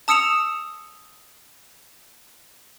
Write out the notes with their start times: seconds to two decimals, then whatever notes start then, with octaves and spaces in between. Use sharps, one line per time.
0.08 A5 D#6 E6 C#7 E7 F7